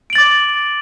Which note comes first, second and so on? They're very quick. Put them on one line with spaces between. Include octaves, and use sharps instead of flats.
D7 F#7 A6 D6